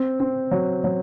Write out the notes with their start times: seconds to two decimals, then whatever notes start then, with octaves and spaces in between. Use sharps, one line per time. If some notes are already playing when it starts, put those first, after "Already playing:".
Already playing: C4
0.20 C4
0.51 F#3
0.84 F#3